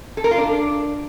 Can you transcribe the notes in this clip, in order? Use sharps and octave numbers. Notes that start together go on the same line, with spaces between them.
A4
A#4
F4
D4